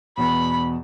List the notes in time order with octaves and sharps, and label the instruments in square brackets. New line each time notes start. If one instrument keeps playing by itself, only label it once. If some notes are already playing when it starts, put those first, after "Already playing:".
[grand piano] E2 B2 [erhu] B5